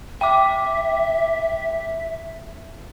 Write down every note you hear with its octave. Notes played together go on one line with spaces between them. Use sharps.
E5 G5 D6